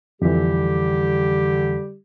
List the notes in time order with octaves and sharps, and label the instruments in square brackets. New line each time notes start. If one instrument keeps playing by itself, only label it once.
[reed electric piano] F2 E3 [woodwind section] D3 G3 G4